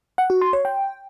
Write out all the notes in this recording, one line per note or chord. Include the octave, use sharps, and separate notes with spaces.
F#5
F#4
C6
C#5
G5